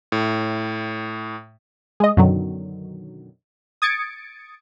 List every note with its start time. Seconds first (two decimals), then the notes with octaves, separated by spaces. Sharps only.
0.12 A2
2.00 G#3 D#5
2.17 F#2 B2 D3 D#3 F#3
3.82 D#6 G#6 A6 C#7 D7